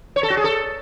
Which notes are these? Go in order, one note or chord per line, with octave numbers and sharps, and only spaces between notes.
C#5
A4
F#4
G#4
A4